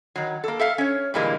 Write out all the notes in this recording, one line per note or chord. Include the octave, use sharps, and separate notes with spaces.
D#3 F#3
A#3 A4
A4 E5 F5
C#4 C#5
A#2 D3 E3 G3 G#3 A#3